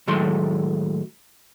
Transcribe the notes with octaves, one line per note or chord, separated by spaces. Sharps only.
A2 D#3 F#3 G#3 A3 C6